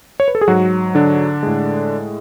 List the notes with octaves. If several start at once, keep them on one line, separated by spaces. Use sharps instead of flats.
C#5
B4
A4
G#4
G#2 F#3 F#4
D3 D4
A2 G#3